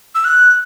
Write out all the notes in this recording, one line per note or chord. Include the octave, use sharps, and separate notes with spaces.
E6
F#6